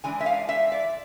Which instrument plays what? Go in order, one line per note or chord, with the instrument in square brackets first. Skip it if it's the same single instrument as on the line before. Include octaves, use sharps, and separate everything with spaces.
[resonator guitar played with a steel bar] E3 G#3 D4 G#5
E5
F5
E5
D5